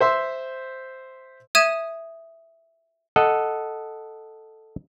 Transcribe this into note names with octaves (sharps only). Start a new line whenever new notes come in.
C5 E5 C6
E5 D#6 G#6 D#7 E7
A4 D#5 F#5